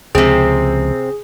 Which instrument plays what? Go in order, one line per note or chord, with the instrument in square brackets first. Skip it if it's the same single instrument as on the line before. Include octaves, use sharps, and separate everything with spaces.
[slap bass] C#2 F3 [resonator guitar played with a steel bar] C3 C4 [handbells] G#4